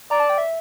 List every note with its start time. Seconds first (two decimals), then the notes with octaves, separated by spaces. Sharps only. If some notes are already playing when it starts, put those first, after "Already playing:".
0.11 D5 A#5
0.20 A5
0.30 G5
0.38 E5